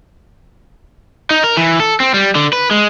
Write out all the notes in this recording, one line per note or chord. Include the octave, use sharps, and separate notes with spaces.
D#4
A#4
E3
A4
C4
G3
D3
B4
G#3